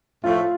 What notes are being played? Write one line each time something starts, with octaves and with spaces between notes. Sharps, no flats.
A2 F3 A3 F4